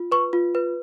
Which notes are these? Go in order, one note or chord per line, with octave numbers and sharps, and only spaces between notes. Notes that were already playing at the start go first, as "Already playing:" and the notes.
Already playing: F4
B4 C#6
F4
B4